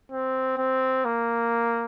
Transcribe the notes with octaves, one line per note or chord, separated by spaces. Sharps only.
C4
C4
A#3